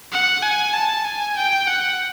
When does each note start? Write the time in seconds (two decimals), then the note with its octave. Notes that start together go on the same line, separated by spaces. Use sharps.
0.12 F#5
0.43 G#5
0.74 A5
1.05 G#5
1.37 G5
1.67 F#5